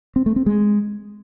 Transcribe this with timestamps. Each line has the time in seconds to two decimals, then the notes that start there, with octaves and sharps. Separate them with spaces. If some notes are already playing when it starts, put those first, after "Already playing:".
0.16 C4
0.26 A3
0.36 C4
0.46 G#3